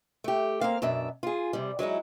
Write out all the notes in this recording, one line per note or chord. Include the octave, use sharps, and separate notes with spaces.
A3 G4
A#3 C4 F5
F#2 B2 D4 E5
F4 G#4
C3 G3
F#3 G#3 D#4 E4